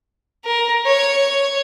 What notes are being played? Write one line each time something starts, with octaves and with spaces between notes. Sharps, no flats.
A#4
C#5